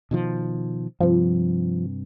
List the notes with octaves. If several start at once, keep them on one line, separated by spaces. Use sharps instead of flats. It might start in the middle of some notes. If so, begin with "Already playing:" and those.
B2 D#3 F3
G2 C3 F3